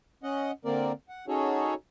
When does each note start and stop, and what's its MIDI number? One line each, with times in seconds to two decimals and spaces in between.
0.23 0.51 61
0.23 0.51 75
0.23 0.51 78
0.65 0.92 50
0.65 0.92 58
0.65 0.92 60
0.65 0.92 70
0.65 0.92 74
1.09 1.25 78
1.28 1.74 61
1.28 1.74 63
1.28 1.74 66
1.28 1.74 68
1.28 1.74 69
1.28 1.74 73